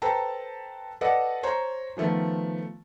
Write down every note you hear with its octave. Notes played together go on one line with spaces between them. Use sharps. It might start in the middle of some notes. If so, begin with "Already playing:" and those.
A4 B4 C5 G5 A5 A#5
A4 B4 D5 D#5 F#5
C5 C#5 A#5 C6
D#3 F3 A3 B3